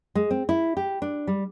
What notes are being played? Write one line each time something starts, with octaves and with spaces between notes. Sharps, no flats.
G#3
C4
E4
G4
D4
G3